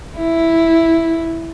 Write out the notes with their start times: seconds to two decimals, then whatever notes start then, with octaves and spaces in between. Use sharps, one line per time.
0.18 E4